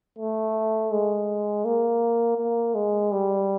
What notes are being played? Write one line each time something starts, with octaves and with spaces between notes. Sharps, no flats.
A3
G#3
A#3
A#3
G#3
G3